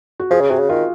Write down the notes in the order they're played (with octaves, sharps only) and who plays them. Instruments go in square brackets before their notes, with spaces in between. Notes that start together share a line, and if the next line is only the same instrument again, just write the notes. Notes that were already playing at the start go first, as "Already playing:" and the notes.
[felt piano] F#4
[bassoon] F3 [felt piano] G#4
[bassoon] C#3
[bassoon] C3 [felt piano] F#4
[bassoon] C#3
[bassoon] D#3 [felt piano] F4